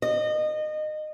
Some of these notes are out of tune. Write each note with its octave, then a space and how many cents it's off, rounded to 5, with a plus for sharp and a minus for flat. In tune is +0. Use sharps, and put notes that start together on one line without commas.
D#5 -25